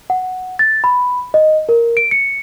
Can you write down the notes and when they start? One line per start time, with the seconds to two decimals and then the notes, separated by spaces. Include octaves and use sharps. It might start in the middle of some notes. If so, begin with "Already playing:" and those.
0.10 F#5
0.59 A6
0.84 B5
1.34 D#5
1.69 A#4
1.97 D7
2.11 C#7